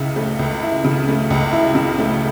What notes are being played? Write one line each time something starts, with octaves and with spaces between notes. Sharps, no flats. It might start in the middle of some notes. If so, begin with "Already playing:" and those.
Already playing: C#2 C#3 E4
A3
C#2
E4
C#3
A3
C#2
E4
C#3
A3